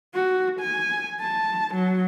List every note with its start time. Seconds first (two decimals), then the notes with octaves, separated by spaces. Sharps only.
0.15 F#4
0.60 G#5
1.20 A5
1.74 F#3